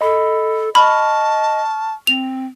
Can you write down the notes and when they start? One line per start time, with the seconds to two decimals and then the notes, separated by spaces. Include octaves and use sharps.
0.01 A4 D#5 B5
0.75 D#5 A5 B5 C#6 F6
2.07 C4 F7